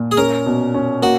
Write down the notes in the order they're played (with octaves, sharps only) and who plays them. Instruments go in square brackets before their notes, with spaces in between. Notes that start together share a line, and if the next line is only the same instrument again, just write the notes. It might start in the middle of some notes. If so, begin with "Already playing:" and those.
Already playing: [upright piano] A#2
[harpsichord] G#4
[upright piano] C#4 [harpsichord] A#4
[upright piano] B2
C#4
[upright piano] A#3 [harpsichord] F#4